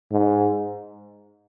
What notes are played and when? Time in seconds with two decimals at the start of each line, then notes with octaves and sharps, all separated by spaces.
0.11 G#2